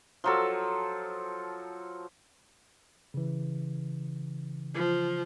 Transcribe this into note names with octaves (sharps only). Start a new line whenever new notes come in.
F3 F#3 A4
C#3 E3
F3